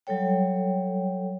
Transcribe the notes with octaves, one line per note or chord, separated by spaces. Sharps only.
F#3 G3 A4 C#5 G5